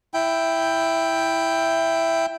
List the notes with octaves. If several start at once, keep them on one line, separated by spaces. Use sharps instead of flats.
E4 G5